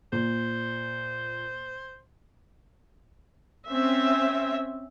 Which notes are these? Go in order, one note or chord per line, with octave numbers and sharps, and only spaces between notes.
A#2 C5
C4 C#4 E5